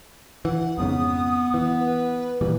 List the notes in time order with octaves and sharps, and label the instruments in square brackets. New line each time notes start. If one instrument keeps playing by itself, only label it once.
[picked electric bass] E3 [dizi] F#5
[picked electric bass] F2 G#2 C#3 [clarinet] B3 [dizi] D#6
[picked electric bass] E3 [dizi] F#5
[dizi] B4
[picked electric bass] A#2 E3 G3